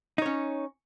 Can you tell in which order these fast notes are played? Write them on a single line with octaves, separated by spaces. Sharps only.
D#4 C#5 C#4